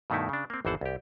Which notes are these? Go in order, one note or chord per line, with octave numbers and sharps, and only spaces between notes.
G2 B2 D#3 A3 D#4 E4
C#3 D4
A#3 C4
G#1 E2 E3 C5 F#5 A5
C2 G4